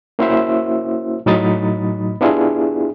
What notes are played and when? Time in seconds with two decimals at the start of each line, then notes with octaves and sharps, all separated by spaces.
0.19 A#3 C#4 E4 F#4 C5 E5
1.26 A2 F#3 D#4 B5 D#6 A6
2.21 B3 D4 E4 F4 G4 G#4